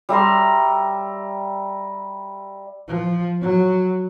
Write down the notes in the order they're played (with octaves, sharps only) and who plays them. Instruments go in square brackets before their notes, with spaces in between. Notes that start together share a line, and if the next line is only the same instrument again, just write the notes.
[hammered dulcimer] G3 E5 A#5 C6
[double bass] F3
F#3